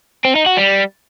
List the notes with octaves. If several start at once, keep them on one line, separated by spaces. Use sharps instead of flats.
C4
D#4
F#4
G3